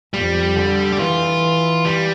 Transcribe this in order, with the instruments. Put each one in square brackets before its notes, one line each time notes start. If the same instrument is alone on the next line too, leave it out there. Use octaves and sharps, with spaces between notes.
[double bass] F2 [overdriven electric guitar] G3
[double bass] D3
[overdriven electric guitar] G4
[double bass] E3 [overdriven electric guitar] F4
[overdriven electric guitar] G3